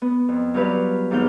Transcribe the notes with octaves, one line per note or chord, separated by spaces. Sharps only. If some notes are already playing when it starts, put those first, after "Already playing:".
B3
F2
F#3 G3 F4 G4 B4 F5
D#2 G#2 B3 F5 G6